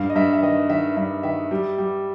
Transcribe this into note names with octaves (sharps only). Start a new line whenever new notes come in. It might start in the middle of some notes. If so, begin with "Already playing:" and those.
Already playing: G2 F5
D#5
G2 E5
E5
D#3 D#5
D#3 E5
G2 E5
D#3 E5
G3
G3